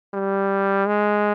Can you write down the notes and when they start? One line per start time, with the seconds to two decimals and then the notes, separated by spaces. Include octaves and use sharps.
0.14 G3
0.87 G#3